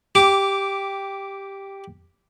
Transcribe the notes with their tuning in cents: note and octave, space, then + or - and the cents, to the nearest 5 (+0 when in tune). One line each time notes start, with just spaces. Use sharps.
G4 +0 D6 -10